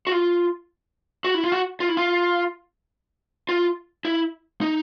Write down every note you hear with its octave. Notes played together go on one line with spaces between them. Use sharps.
F#4
F4
F#4
E4
F4
F#4
F4
E4
F4
F4
E4
D#4